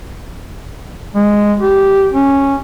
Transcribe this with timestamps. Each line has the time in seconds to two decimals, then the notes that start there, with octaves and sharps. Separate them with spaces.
1.15 G#3
1.60 G4
2.12 C#4